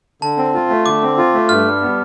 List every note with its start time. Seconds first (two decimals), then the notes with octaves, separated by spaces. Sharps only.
0.22 D3 A5
0.37 C4
0.54 F4
0.69 A3
0.86 D3 D6
1.02 C4
1.18 F4
1.34 A3
1.49 G2 F6
1.65 G3
1.82 B3